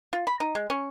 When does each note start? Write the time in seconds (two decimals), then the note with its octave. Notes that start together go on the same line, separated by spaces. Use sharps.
0.13 F4
0.27 B5
0.40 D#4
0.55 G#3
0.70 C#4